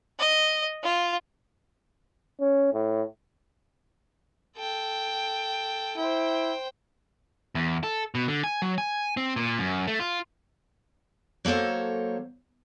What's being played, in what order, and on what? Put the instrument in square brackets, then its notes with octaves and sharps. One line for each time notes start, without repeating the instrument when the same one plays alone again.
[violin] D#5
F4
[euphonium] C#4
A2
[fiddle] A4 G5
[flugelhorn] E4 [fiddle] C5 G5
[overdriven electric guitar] E2
A4
B2
D3
G#5
F#3
G#5
C4
A#2
F#2
A3
F4
[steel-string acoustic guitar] F#3 A#3 A4 C5 C#5